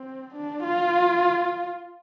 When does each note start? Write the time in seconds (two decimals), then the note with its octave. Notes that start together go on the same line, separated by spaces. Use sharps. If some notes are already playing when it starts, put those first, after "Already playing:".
Already playing: C4
0.35 D4
0.63 F4